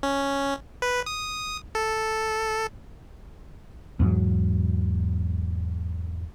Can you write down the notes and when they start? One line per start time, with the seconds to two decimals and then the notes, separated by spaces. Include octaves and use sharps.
0.03 C#4
0.82 B4
1.06 D#6
1.75 A4
4.00 E2 G#2 F#3